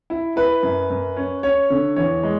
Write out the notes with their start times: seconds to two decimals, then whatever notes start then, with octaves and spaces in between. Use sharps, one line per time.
0.10 E4
0.36 E4 B4
0.63 F#2
0.90 F#2
1.16 C#4
1.43 C#4 C#5
1.70 D3
1.96 E2 C#5
2.23 G#3